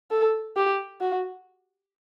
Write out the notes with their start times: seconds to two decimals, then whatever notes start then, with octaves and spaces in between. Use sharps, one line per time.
0.11 A4
0.56 G4
1.01 F#4